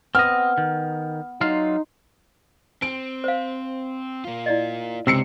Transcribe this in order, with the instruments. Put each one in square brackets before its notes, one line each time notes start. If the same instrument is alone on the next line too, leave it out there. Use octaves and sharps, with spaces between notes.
[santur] B3 [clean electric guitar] C4 D#5 [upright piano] F6
[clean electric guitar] D#3
[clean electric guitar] F#3 F4 F5 [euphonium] D#4 [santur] C6
[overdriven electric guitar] C4 [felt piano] D7
[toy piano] C5 F5
[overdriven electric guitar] A#3 F4
[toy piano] E4 D5 D#5
[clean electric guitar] C#2 C3 [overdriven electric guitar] C4 D4 [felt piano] E6 C7 C#7